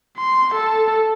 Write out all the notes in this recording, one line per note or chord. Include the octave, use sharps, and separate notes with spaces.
C6
A4